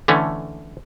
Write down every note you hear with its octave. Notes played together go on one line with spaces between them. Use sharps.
D3 E3 A3 C#4